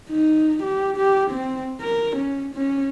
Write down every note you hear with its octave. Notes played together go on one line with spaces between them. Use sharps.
D#4
G4
G4
C4
A#4
C#4
C#4